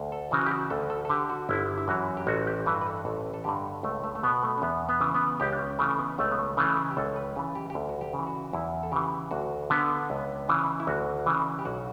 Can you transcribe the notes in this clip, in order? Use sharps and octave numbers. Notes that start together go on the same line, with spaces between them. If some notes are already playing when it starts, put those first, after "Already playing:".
Already playing: D2
A4
C#3 E3 F#4
G4
F#4
D2 A4
A4
A4
D3 G4
F#4
G1 E4
E4
F#2 E3 F#4
G4
A1 F#4
G4
G2 E3 B4
B4
A4
A1 A4
A4
G2 D3 G4
C#2 A3
A3
A3
B2 B3
A3
C#4
E2 B3
B3
C#3 E3
B3
C#2 G4
D4
C#4
C#3 E3 A3
B3
C#2 A3
B3
A3
C#3 E3 A3
G4
C#2 A4
B4
C#3 E3 B4
G4
G4
D2 A4
F#4
G4
C#3
E3
F#4
E2 E4
A4
C#3 E3 G4
D2 F#4
D3 B3
C#2
C#3 E3
E4
D2 F#4
C#3 E3
G4
B1 F#4